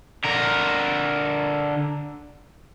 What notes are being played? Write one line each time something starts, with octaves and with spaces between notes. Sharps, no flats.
D3 A#4